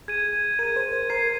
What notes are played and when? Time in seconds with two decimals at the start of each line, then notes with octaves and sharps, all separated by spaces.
0.08 G#4 G#6 D#7
0.59 A#4 G#6 D#7
0.76 C5
0.92 C5
1.10 A#4 G#6 C7 D#7